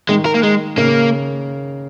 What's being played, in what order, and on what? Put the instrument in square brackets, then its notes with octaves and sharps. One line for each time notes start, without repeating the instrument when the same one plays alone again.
[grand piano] D#3 [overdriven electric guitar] G#3
[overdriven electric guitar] A#4
A#3
G#3
[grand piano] C#3 [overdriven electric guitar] A#3